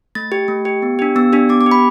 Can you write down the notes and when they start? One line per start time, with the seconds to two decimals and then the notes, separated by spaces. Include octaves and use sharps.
0.15 A3 A6
0.32 G4
0.48 A3
0.65 G4
0.82 B3
0.99 D4 G4
1.16 B3 E6
1.33 D4 G4
1.49 B3 D6
1.61 D6
1.66 G4
1.71 B5